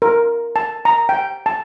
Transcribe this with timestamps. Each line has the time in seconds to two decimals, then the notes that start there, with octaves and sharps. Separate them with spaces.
0.02 A#4
0.56 A5
0.85 A#5
1.09 G5
1.46 A5